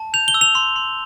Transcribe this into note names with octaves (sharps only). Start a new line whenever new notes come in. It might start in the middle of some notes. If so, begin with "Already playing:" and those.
Already playing: A5
G6 F7
G7
E6
F7
C6
C6